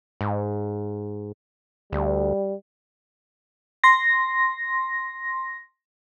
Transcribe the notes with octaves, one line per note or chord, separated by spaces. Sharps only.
G#2
D2 G3
C6 A#6